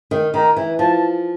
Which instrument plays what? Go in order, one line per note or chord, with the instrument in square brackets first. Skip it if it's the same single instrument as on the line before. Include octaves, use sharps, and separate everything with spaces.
[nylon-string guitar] D#3
[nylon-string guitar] D#3 [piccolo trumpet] A#5
[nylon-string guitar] E3
[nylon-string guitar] F3 [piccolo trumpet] A5